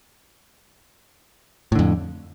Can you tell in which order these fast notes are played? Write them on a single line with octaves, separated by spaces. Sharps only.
A2 D3 F2